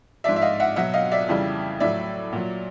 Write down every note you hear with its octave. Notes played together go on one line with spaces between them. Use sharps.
G#2 F3 D5 E5
E5
D#5 F5
E5 F#5
B2 F#3 E5 F#5
D#5 F5
D5 E5
F2 C#3 E3 G3
A2 F#3 D5 E5
A#2 F#3